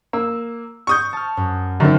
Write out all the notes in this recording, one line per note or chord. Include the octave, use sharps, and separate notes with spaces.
A#3 E6
C#6 D#6 G6
A5 F6
F#2
F#2 D3 D#3 A3 C4